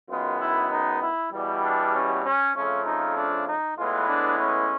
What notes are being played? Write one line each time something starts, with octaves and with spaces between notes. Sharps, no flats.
F#2 D#3 G#3 B3 F4
E4
D#4
E4
E2 B2 G3
D4
C#4
C#4
F2 C#3 F3 A3 C#4
D#4
D4
D#4
A2 E3 G#3 B3 F4
D4
C#4